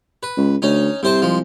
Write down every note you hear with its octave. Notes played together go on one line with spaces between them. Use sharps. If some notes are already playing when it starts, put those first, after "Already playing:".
B4
C#2
D2 C#4 D#4
C2 C3 C5 A5
F3 G#3